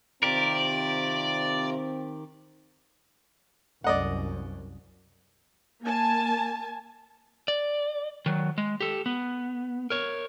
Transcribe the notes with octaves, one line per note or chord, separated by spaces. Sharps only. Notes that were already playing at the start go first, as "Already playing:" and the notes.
C3 D#3 C4 F4 G4 A#4 D5 A#5
C2 F#2 D5 D#5 F#5
A#3 G#5 A5
D5
D#3 F#3
G#3
G4 A4
B3
A#4 C#5